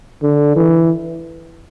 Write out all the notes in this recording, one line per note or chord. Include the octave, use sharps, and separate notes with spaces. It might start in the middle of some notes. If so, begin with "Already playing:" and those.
D3
E3